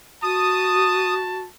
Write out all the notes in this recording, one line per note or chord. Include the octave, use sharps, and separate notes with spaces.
F#4 A5 D#6